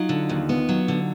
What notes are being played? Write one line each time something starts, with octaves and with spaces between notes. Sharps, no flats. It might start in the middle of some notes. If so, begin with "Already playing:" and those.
Already playing: F#3 D#4 F4
D3
D#2
B3
F#3
D3